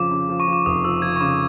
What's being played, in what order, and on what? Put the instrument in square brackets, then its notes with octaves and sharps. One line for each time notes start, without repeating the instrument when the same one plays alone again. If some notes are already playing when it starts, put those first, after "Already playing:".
Already playing: [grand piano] F2 C#3 F3 [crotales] D6
[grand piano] C#3
F3
[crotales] C#6
[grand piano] F3
[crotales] D6
[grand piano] F1 [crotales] D#6
[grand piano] F3 [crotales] E6
[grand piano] F3 [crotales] G#6
[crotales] C#6
[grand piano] C#3 [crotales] D6